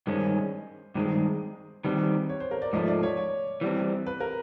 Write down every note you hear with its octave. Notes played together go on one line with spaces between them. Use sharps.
G2 D#3 G#3 C#4 C5
G2 D#3 G#3 C5
D#3 G3 C4 B4
C#5
C5
A#4
D5
G#2 F3 A3 D#5
D5
C#5
C#5
E3 G3 C4
B4
A#4